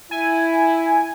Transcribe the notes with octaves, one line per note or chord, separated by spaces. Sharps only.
E4 G#5